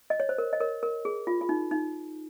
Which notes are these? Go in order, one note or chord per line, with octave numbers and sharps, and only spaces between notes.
D#5
C#5
C5
A#4
D#5
A#4 C#5
A#4
G#4
F4
F4
D#4
D#4